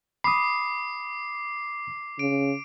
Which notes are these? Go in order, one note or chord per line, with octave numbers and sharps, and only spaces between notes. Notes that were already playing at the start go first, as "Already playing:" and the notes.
B5 D6 D#6 C7
C#3 D7